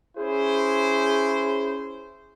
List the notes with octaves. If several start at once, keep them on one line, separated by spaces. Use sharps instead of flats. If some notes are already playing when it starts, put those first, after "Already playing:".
C#4 E4 G#4 C5